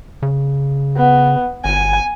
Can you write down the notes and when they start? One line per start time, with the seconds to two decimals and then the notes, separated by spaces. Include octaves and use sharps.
0.22 C#3
0.96 B3
1.65 G1 G#5